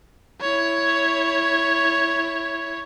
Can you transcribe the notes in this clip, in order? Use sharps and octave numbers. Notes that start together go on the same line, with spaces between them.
E4 C#5